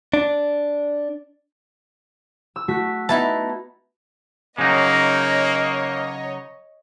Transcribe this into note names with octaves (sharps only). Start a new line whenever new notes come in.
D4
E6
A3 F#4 B6
B3 D#4 E4 A5
C#3 F#3 A#3 D#4 C#5 D#5